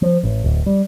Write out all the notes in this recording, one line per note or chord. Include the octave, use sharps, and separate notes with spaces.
F3
A1
D1
G3